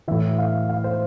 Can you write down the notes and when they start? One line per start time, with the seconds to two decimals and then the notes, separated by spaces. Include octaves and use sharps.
0.08 A2 E3 E5
0.39 F5
0.69 F5
0.84 C5